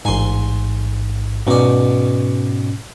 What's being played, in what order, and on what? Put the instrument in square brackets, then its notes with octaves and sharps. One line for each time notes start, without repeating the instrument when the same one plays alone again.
[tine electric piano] A1 G#2 [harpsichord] G#5 C6
[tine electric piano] G#2 C#4 [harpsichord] B2 D5